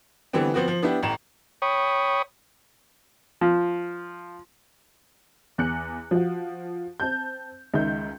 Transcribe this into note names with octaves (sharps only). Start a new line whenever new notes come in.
D3 E3 G3 B3 C4
F3 B3 C4 F#4
F3
B3 D4 E4 G4
A1 A2 A#5 E7
C#5 G5 B5 C#6 D#6
F3
E2 F#6 C#7
F3 F#4
C4 A5 G6
C#2 D#3 E5 G6